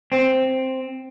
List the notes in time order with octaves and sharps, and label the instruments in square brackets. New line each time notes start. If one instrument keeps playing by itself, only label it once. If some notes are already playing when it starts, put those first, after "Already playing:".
[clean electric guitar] C4